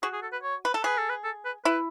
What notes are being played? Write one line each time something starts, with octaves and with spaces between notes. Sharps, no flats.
F#4 G#4
G#4
A4
B4
C#5
B4
A4
G#4 B4
A4
B4
A4
B4
E4 B4